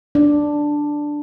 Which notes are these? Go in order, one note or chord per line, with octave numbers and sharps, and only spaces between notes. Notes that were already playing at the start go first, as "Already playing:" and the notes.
D4